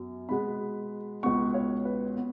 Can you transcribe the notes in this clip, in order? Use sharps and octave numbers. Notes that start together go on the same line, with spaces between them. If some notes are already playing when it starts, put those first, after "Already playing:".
Already playing: F#2 F#3 B3
B2 G#3 B3 B5
C#2 B2 B3 C#6
C#5
B4
B3